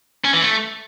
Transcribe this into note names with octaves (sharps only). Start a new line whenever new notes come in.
C#4
E3
A3